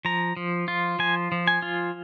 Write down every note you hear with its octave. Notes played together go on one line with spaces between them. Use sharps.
F3 A#5
F3
F4
F3 G#5
F3
G#5
F4